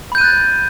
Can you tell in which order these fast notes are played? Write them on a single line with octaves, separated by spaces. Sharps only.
B5 G6 D#7 F#6 A6